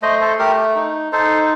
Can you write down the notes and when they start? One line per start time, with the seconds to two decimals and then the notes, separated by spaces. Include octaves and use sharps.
0.02 A3 C5 D#5
0.20 A4 C5
0.39 A3 G4 A#4
0.75 D#4
1.12 D#4 A4 C5